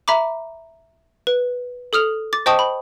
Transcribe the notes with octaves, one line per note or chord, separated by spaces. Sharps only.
E5 A#5 B5 D6
B4
A4 D#6 F6 F7
D6 A6
C5 D#5 G5 A5 C#6 D#6
B5